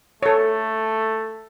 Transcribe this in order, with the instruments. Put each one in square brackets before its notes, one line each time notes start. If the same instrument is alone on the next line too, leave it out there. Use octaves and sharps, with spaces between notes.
[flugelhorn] A3 [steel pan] A4 C#5